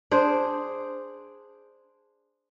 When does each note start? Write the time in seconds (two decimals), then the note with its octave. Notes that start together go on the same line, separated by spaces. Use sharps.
0.11 D4 G#4 C5